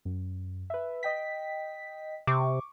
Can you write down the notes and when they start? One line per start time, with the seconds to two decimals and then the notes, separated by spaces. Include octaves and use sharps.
0.05 F#2
0.70 B4 E5
1.03 D#5 G5 B6
2.27 C3 C#6 D6